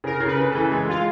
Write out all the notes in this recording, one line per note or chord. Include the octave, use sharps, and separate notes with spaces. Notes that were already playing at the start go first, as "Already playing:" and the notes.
C#3 A#4
C#3
B4
C#3
A4
E3
G#3
G#3 F4